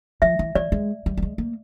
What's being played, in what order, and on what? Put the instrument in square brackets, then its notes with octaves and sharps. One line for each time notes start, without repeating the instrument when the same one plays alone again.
[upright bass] F3 [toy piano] E5
[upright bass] E3
[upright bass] E3 [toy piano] D5
[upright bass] G#3
G3
G3
G#3
A#3